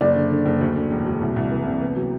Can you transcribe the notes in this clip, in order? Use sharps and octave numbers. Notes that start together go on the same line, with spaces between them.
F#1 D5
D3
D3
F#1
D2
D3
E1
F#3
C2
C2
E3
C3
B3
F#3